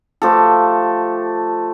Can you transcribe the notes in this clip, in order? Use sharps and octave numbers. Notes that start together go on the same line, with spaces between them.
F3 A3 G4 A4